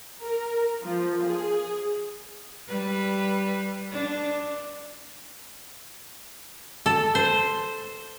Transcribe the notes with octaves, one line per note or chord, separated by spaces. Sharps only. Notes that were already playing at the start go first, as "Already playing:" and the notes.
A#4
F3
G#4
G3 B4
D4
A4
C5